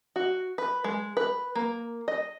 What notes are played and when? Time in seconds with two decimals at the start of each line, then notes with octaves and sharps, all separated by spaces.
0.16 F#4
0.58 B4
0.84 G#3
1.17 B4
1.55 A#3
2.08 D#5